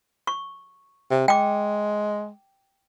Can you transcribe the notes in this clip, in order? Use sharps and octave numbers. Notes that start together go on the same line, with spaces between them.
C#6
C3
G#3 G5 D6